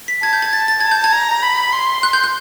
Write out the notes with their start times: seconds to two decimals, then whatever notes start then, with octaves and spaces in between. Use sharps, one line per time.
0.08 B6
0.23 A5 G#6
0.33 G6
0.42 G#6
0.53 A6
0.68 A6
0.80 A5 G#6
0.91 G6
1.04 G#6
1.13 A#5
1.43 B5
1.73 C6
2.03 F#6
2.13 G6
2.24 F#6